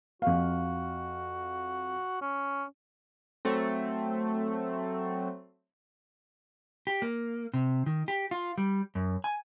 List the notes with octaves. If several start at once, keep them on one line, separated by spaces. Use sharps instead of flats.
F2 F#4 F5
C#4
F#3 A3 C4
G4
A#3
C3
D#3
G4
F4
G3
F#2
G#5